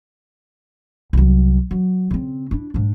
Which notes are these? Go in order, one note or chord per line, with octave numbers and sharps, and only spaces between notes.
C2 F#3
F#3
C#3 C4
D4 E4
G#2 D4